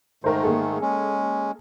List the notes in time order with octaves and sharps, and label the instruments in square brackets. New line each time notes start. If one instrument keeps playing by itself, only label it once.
[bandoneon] G#2 D#3 A3 [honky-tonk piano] A#4 C5
[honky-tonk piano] A#3 G#4 A4
[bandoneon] G#3 C#4